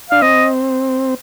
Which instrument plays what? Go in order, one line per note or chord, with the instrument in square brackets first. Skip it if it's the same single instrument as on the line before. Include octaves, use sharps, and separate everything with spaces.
[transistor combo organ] D4 [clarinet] F5
[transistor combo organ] C4 [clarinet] D#5